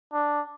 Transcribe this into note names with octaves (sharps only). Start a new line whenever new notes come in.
D4